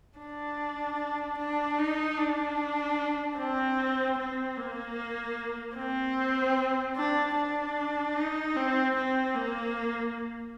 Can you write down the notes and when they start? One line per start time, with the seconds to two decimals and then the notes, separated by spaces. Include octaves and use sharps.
0.19 D4
1.38 D4
1.79 D#4
2.18 D4
3.38 C4
4.18 C4
4.57 A#3
5.77 C4
6.96 D4
7.36 D4
8.16 D#4
8.56 C4
8.96 C4
9.35 A#3